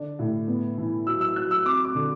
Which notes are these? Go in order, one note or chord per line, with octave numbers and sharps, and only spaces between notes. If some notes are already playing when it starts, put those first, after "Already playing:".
Already playing: D3 D4
A2
B3
E3
F#3 E6
E6
F#3 F#6
E6
C4 D6
D6
D3